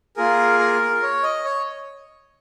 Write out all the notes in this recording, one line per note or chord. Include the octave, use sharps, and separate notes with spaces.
A#3 F4 G#4 A#4
A#4
C#5
D#5
C#5